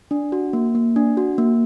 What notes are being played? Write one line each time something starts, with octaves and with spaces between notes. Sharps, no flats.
D4
F#4
A#3
A#3
D4
F#4
A#3